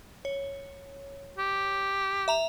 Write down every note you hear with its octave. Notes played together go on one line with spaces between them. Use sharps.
C#5
G4
E5 A#5 F7